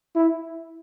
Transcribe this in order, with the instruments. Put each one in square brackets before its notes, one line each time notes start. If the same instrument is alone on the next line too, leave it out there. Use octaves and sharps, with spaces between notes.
[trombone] E4